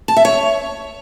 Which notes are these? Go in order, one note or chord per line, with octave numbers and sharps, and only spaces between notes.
A5
E5
C#5